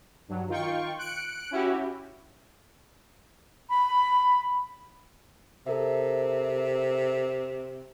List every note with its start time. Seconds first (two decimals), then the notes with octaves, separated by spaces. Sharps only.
0.28 G2 F#3
0.48 D#3 F4 G5 C#6
0.98 F#6 C#7 D7
1.51 C#4 E4 F#4 G4
3.69 B5
5.66 C3 A4 A#4 E5